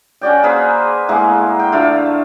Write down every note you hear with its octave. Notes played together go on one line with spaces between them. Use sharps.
C#4 F#4 D5 G5
A#3 G#4 B4 C5
A2 G#3 A#3 B3
G5
D3 A3 F4